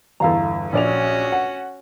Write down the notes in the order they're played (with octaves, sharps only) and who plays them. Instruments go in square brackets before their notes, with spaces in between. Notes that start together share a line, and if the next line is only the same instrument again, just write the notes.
[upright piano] G1 E2 [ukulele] A4 F5 A#5
[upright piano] A#1 D5 F7 [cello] C#4 F#4
[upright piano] F#5